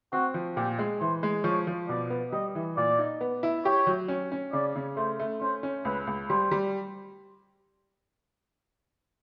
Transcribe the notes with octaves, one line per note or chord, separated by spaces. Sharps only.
C4 F#4
F3
A#2 G4
G#3
E3 C5
G#3
F3 C#5
F3
B2 D5
B3
G3 D#5
E3
A#2 D5
D#4
B3
E4
G4 C#5
F#3
C#4
C#4
C#3 D5
C#3
A3 C5
A3
C#4 C5
C#4
C#2 B4
C#2
G3 C5
G3